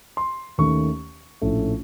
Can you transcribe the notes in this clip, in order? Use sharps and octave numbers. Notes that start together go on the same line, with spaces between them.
C6
D#2 D#3 A3 C#4 C#6
A#1 A2 A3 C#4